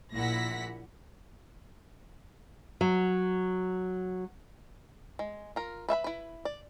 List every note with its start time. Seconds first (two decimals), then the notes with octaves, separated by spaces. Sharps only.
0.13 A#1 A#2 E4 F#5 A#6 B6
2.81 F#3
5.19 G#3
5.56 F4 A#4
5.89 B4 E5 F5 B5
6.04 E4 B4
6.45 D5